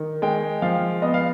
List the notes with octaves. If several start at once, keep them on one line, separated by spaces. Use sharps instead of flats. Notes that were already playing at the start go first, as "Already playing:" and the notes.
Already playing: D#3
G#3 G5
F3 F5
B3 D#5
F5